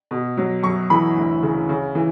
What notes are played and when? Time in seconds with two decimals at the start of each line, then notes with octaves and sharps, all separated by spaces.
0.11 B2
0.37 F#3
0.63 F#2 C#6
0.90 E3 B5
1.16 D2
1.42 C#3
1.69 C#3
1.95 E3